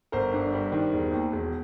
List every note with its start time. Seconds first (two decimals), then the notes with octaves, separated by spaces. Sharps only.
0.12 G1 A#4 C5
0.33 G2
0.53 G3
0.72 D#3
0.93 E1
1.12 D#2
1.33 E1